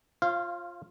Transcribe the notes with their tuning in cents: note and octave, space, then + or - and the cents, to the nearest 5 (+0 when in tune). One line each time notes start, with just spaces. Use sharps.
F4 +0 C5 +45 F5 -15